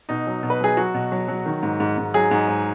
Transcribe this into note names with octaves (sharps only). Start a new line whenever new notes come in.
B2 D#4
F#3
B2
B4
F#3 G#4
F#3 F#4
B2
F#3
F#3
D#3
G#2
G#2
G#2
F#3 G#4
G#2
G#2